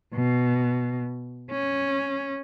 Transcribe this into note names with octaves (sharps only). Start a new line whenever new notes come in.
B2
C#4